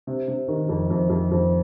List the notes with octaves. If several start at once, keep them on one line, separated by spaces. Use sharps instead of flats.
C3
C3
D#3
F2
F2
F2
F2